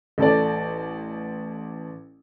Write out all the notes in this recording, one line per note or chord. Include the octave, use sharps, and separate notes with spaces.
A1 A4 D5